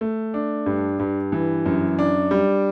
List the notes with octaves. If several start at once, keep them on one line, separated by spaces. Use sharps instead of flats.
A3
D4
G2
G2
E3
F#2
D4
G3